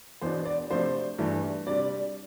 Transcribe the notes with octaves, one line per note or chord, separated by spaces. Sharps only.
E2 B2 B3 D4 C5
D5
C3 F3 A3 D4 C5
G2 E3 A3 D4
C3 G3 D4 D5